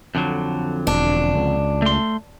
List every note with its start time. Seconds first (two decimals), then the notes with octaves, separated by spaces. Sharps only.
0.15 F2 D3 F#3
0.87 E1 D4
1.35 C#2
1.82 A3 C6